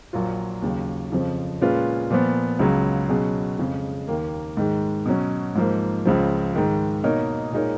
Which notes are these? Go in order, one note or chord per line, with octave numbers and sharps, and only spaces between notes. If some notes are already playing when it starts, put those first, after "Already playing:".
A#1 A#2 F#3 A#3 F4
D#2 C#3 F#3
F2 C#3 F3
A#2 G#3 C#4 F4 B4
A#2 F3 B3
C#2 C#3 F#3
B2 F#3 C#4 G#4
F2 C#3 G#3
D#2 D#3 A#3
G#2 D#3 G#3
B2 F#3 C#4
G#2 F3 A#3
C#2 C#3 F3
G#2 D#3 G#3
B2 A#3 D#4 A#4 C#5
A#2 G#3 D#4 A#4 C#5